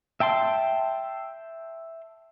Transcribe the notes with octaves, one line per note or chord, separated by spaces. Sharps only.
E5 G5 A5 C6